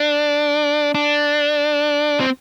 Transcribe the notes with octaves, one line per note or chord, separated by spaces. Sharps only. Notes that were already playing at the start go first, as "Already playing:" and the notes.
Already playing: D4
D4
C4